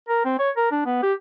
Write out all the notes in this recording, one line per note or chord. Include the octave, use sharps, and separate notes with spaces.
A#4
C4
C#5
A#4
D4
B3
G4